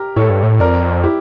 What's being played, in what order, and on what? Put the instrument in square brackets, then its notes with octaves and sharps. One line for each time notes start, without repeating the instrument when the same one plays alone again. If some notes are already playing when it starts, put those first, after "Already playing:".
Already playing: [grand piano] G4 A#4
[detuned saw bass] A2 [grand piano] A4 C#5
[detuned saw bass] G2
A2
[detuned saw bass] F2 [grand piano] A#4 D5
[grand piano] E4 G4